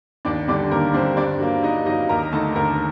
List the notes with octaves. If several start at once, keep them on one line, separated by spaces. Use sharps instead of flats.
D#2 D4 D5
D3 G3 D4 D5
D#2 A#3 A#4
D3 G3 C4 D4 C5
G2 D4 D5
F#3 A#3
G2 D#4 D#5
F#3 A#3 D#4 D#5
D#2 A#4 A#5
D3 A3 D#4 A4 A5
D#2 A#4 A#5